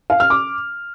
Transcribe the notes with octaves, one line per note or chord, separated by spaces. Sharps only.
F5
F6
D6